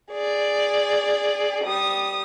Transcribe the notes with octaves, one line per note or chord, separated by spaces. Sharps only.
G#4 D5
G3 D#6